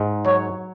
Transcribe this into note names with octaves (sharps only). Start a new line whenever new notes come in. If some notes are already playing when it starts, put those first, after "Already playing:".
Already playing: G#2
F#3 C#5